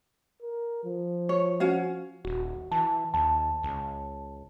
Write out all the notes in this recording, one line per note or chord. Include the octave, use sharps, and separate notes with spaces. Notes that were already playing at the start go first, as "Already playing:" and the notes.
A#4
F3
C#5
C#4 F#4 F5
D#1 F#4
E3 A5
D#2 A5
C#2